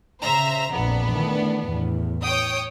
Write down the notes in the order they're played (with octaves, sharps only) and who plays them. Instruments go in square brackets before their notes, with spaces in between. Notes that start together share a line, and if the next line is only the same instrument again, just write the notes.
[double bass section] C#3 [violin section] C5 E5 A#5
[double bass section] A#1 F2 [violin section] B3 D4
[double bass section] D#3 E3 A3
E2 A2
[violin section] C#5 G5 D#6